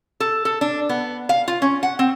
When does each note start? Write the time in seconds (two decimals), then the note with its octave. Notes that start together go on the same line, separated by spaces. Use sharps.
0.20 A4
0.45 A4
0.61 D4
0.89 B3
1.29 F5
1.48 F4
1.62 C#4
1.83 F#5
1.99 C4